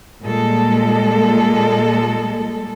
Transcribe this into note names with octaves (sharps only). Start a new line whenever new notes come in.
A#2 G3 G#3 A4